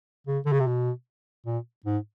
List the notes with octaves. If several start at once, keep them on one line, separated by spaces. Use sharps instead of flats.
C#3
D3
C#3
C3
B2
A#2
G#2